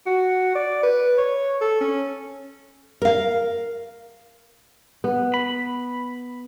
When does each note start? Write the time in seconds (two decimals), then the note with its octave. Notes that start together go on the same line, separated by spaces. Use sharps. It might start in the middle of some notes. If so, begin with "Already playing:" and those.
0.07 F#4
0.55 D5
0.83 B4
1.18 C#5
1.61 A4
1.81 C#4
3.02 A#4 F5
5.04 B3
5.34 B5